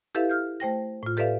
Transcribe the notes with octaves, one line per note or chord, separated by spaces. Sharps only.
E4 G4 A4 B4 E5 F5
F6 G6
A3 C5 G5 A#6
A2 F4
G4 A4 B4 D5 E5 F5